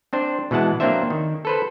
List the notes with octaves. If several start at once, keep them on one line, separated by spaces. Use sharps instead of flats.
C4 D4 C5
B2 E3 G#3 F#5 A5
F#3 A#3 C4 D4 C5 E5
D#3
A4 B4 C5